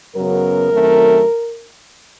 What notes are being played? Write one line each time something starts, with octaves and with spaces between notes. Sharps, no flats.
F#2 C#3 F#3 B3 A#4
F#2 D#3 F#3 A3 C4